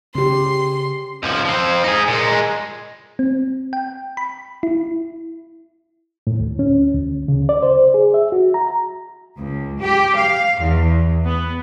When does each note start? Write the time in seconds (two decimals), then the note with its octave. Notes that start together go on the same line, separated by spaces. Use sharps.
0.15 C#3 C#4 G4 C6
1.23 C#2 F3
1.45 F3 C4
1.84 D#4 G#4
2.08 A#2 G#3
3.19 C4
3.73 G5
4.17 B5
4.63 E4
6.27 A2
6.40 D2
6.59 C#4
6.94 D2
7.28 C#3
7.49 D5
7.62 C5
7.94 G#4
8.14 E5
8.32 F#4
8.54 A#5
9.37 C#2
9.81 G4
10.14 F5
10.60 E2
11.25 B3